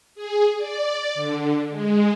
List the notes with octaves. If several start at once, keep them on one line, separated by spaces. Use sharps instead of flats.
G#4
D5
D3
G#3